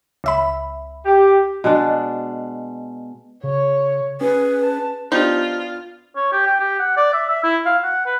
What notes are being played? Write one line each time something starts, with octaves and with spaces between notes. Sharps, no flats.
C#2 E5 B5
G4
B2 G#3 D4
C#3 C#5
C#4 G#4 B4
A5
F3 B3 D4 D#4 F4 G4
C#5
G4
G5
G4
F#5
D5
E5
E5
E4
F5
F#5
B4